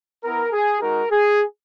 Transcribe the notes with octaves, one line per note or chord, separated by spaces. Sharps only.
B3 E4 A#4
G#4
G#3 D#4 F#4 A#4
G#4